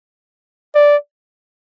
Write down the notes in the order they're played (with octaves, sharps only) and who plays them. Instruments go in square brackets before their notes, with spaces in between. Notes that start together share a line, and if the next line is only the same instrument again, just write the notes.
[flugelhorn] D5